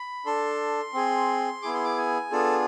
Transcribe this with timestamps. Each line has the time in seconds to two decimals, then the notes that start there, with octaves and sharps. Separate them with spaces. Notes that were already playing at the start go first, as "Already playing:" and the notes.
Already playing: B5
0.26 D4 A4 C6
0.94 C4 G#4
1.63 B3 E4 G#4 D6
1.74 C6
1.85 D6
1.97 G#5
2.31 B3 D4 F4 G#4 A4